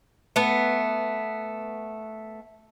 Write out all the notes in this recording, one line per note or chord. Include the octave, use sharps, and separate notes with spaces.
A3 B3